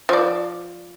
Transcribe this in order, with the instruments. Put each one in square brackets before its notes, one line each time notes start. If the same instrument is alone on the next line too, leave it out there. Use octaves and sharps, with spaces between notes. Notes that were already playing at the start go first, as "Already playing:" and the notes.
[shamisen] F3 D5